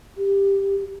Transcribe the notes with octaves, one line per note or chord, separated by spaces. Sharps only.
G4